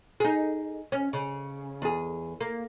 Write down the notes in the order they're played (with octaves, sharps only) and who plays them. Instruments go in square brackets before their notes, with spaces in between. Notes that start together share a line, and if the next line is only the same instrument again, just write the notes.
[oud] D#4 G#4
C#4
C#3
E2 G#4
A#3